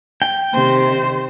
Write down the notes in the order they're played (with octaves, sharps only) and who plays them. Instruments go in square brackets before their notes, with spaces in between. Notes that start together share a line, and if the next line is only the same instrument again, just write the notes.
[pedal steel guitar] G5
[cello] C3 D#3 [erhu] C5